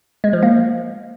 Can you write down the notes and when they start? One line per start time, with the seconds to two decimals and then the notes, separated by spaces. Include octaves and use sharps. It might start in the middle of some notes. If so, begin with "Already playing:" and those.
0.24 G#3
0.33 F3
0.43 A#3